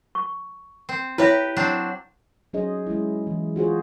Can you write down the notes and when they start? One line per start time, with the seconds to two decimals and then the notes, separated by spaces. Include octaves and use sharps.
0.15 C#6
0.89 C4
1.18 E4 G4 B4 C#5 E5
1.57 F#3 C4 D4
2.53 F#3 C#4 D#4 G#4 C5 D#5
2.87 G#3 C#4 E4
3.27 E3
3.56 F4 F#4 G#4 C5